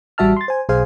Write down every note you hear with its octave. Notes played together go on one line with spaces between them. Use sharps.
A1 G3 F#4 E5 A5 F6
C6 A6
C5 G#5
B1 G#4 C5 F5 G#5